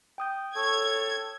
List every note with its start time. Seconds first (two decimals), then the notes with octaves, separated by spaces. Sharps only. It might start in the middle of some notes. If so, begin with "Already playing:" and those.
0.18 G5 D#6 G6
0.56 A4 C#5 G#6